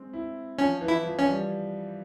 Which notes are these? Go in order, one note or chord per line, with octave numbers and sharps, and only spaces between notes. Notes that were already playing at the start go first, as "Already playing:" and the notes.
Already playing: G#3 C4
E4
F3 C#4
E3
E4
F3
C#4
G3